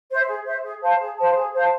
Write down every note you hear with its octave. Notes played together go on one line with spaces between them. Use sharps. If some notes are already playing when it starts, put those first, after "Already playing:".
C5 E5
G#4
C5 E5
G#4
C5 F5 A5
G#4
C5 F5 A5
G#4
C5 F5 A5